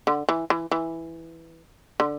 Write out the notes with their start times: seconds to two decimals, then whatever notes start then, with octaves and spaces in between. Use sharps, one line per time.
0.07 D3
0.29 E3
0.50 E3
0.71 E3
2.00 D3